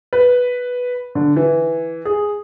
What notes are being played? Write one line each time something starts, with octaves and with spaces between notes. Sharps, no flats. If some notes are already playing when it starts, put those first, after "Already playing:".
B4
D3
E3
G#4